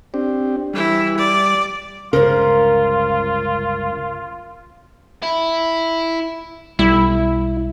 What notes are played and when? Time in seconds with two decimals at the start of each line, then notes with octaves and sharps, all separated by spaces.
0.14 C4 D4 G4
0.74 E3 G3 E4
1.17 D5
2.13 G1 C#2 C#3 F4 A#4 C5
5.23 E4
6.79 B1 G3 E4